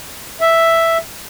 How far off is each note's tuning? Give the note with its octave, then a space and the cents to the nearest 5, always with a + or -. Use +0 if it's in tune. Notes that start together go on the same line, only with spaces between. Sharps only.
E5 +0